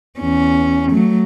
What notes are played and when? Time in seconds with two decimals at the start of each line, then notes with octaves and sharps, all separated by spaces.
0.19 E2 C#4
0.91 F#3 A3